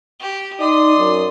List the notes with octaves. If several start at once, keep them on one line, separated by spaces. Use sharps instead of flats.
G4
D#4 D5 C6 D#6
F#2